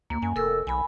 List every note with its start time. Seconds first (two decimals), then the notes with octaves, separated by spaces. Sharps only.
0.10 D2 A#3
0.22 F#2 G#5
0.36 F1 A4 A#4 E6
0.67 B1 G#5 B5